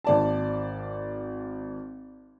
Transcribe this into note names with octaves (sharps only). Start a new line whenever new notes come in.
G#1 D5 A5